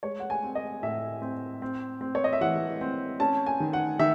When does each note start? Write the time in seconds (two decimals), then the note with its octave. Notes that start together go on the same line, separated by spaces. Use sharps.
0.03 G#3 C#5
0.20 F#5
0.30 G#5
0.43 C4
0.55 D#5
0.83 A2 E5
1.22 C4
1.62 C4
2.01 C4
2.15 C#5
2.24 D#5
2.33 E5
2.41 E3 F#5
2.81 C4
3.20 C#4 A5
3.46 G#5
3.60 D#3
3.73 F#5
3.99 D#3 E5